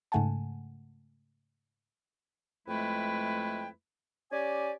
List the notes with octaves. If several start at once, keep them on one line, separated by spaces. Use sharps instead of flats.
G#2 C#3 A3 F#5 G#5 A5
F2 G#3 A3 E4 B4 G5
C#4 G4 D5 G#5